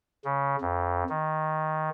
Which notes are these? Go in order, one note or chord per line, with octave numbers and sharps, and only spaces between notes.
C#3
F2
D#3